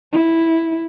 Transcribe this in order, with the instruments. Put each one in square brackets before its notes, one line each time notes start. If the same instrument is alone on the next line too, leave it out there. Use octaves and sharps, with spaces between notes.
[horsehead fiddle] E4